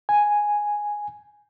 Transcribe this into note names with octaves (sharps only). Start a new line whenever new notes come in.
G#5